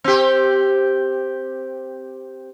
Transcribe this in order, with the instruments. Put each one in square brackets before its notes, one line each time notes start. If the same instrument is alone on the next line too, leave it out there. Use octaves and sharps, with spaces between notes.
[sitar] C4 G4